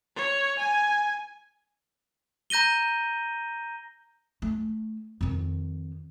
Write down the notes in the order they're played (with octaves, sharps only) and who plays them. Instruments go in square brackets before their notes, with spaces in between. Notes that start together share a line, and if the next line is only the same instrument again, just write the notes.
[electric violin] C#5
G#5
[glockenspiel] A#5 G6 A#6 D#7 G7
[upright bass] A3
F2 D#3